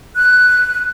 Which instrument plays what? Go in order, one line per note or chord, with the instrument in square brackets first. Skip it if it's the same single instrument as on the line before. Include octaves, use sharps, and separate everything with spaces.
[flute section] F#6